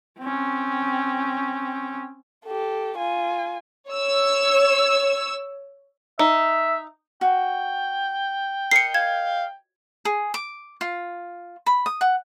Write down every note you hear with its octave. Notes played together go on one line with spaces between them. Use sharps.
C4 C#4
G4 A4
F4 G#5
C#5 E6
D#4 E5
F#4 G5
A#4 D#5 C7 C#7
F5 G#6
G#4
D6
F4
B5
D#6
F#5